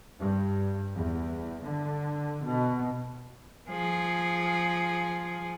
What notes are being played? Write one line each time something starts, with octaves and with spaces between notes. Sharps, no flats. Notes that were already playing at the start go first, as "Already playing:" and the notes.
G2
E2
D3
B2
F3 G#4